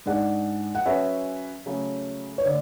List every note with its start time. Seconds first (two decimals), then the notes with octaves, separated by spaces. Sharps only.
0.06 G#2 G#3 D4 F#5
0.75 F#5
0.86 F#3 C#4 G#4 B4 E5
1.66 C#3 F#3 A3
2.38 C#5
2.45 D3 A3 D5